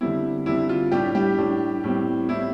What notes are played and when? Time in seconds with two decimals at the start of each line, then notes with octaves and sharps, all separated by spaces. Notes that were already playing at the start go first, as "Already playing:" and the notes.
0.01 D3 G3 C4 E4
0.46 D3 G3 C4 E4
0.69 F4
0.92 A2 G3 D4 G4
1.15 G3 G4
1.38 A2 G3 D4
1.84 A2 G3 C4
2.29 A2 G3 C4 E4